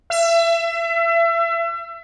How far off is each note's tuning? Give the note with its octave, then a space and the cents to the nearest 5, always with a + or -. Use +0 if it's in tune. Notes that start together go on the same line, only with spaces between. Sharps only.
E5 +30